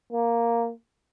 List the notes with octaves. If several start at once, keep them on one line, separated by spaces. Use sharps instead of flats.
A#3